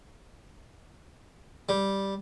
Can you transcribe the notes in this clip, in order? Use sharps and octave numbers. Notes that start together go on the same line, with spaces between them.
G3